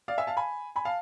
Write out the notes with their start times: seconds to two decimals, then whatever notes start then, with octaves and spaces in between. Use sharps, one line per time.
0.08 D5 F5
0.18 E5 G#5
0.27 F5 A5
0.37 G#5 B5
0.76 G#5 B5
0.85 F5 A5